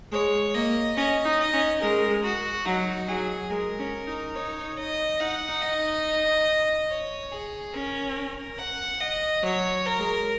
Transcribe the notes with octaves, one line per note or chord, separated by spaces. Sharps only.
G#3 C#5
A#3 D#5
C#4 D#5
D#4
D#5
C#4
G#3 A#4
F#4
F#3 D#4
F#3 G#4
G#3 A#4
C#4
D#4
D#4 C#5
D#5
D#4 F#5
D#4
D#5
D#4
C#5
G#4
C#4 A#4
F#5
D#5
F#3 C#5
A#4
G#3